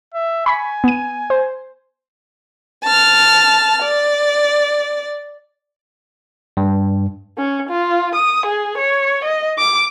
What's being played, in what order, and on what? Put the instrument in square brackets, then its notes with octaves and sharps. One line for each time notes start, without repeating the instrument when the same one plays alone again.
[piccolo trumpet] E5
[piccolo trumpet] G#5 [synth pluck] B5 C#6 B6
[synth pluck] B3 D#7
C5
[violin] A5 F6
D5
[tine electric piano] G2
[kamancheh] C#4
F4
D#6
G#4
C#5
D#5
D6